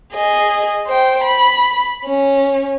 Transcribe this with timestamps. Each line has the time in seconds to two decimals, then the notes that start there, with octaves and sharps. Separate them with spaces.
0.14 G#4 D#5
0.87 C5 G5
1.24 B5
2.05 C#4